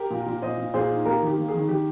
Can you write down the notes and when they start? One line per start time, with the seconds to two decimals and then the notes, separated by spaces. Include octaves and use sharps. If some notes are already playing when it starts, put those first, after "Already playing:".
Already playing: G4 A#4
0.10 A#2
0.26 A#2
0.42 A#2 C5 D#5
0.58 A#2
0.74 A#2 G#4 C5
0.90 D#4
1.05 A#3 G4 A#4
1.22 D#3
1.27 G4
1.38 A#3
1.49 D#3 G#4
1.69 D#3 G4